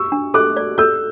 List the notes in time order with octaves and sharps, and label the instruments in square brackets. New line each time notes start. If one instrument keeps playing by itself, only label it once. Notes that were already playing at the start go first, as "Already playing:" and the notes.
Already playing: [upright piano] C#6 E6
[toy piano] D4
[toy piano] A4 [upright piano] D6 F#6
[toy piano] D5
[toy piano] A4 [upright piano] E6 G6